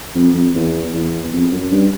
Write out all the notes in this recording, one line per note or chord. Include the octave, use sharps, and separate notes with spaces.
F2
F2
E2
E2
F2
F#2
G2